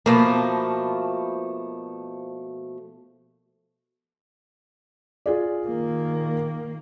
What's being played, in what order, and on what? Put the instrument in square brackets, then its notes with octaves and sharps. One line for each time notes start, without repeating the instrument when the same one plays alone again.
[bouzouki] B2 F3 A3 [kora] A#3
[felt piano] F4 G#4 D5
[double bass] D#3 A#3